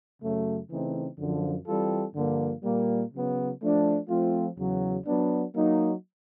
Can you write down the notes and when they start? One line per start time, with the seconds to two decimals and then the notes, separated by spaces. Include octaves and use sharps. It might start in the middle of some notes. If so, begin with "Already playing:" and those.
0.22 F#2 C#3 F#3 A3
0.69 C#3 E3 A3 C4 D#4
1.18 F#2 D3 F3
1.67 E3 G3 C4 F4 A4
2.15 G2 D3 F3 A#3
2.64 A#2 G3 A#3
3.12 C#3 F#3 B3
3.61 F3 A3 D4
4.09 F3 A3 C4 F4
4.57 E2 C#3 F#3
5.07 F#3 B3 D4
5.55 F#3 A#3 D#4